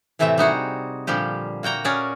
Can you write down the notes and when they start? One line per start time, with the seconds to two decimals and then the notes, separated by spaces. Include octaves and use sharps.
0.19 A2 C3 E3 A3 C4 E5
0.38 G3 D#4 F#4 G#4
1.07 A#2 D3 F3 G3 G4
1.63 A#3 F#4 G5 A#5
1.84 C#4 F#4 G#4 A#4 D5